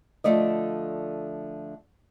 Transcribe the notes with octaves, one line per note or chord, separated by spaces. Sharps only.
D3 F3 A3 D5 D#5